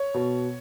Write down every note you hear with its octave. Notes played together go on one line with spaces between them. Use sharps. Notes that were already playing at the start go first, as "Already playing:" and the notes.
Already playing: C#5
B2